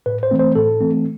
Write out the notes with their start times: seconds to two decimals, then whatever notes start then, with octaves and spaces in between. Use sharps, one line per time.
0.06 A2 B4
0.23 C5
0.31 E3 A3 C4
0.39 C5
0.55 A2 A4
0.80 E3 A3 C4